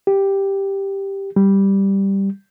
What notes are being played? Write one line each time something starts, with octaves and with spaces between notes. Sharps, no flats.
G4
G3